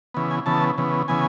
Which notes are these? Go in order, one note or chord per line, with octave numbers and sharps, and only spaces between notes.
C#3 E3 B3
G#5
C#3 E3 B3 A5
C#3 E3 B3
C#3 E3 B3 G#5